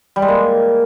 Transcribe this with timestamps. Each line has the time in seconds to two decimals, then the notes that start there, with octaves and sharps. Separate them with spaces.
0.16 G3
0.22 G#3
0.28 A#3